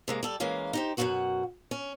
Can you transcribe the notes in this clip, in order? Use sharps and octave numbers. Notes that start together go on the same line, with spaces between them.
C3 G#3 A#3
G3 A4 D5
E3 G#3 A#3 C#4 F5
D#4 G4 C5
F#2 B2 D#3 G#3 F#4 F#5
C#4